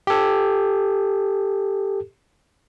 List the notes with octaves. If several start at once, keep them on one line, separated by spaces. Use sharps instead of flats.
G4 A4